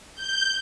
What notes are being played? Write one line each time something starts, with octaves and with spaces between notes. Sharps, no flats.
G6